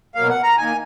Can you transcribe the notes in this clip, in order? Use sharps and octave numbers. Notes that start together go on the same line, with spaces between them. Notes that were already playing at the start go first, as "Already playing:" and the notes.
B2 F#3 A#3 F5
F#5
A#5
D#3 A#3 G#5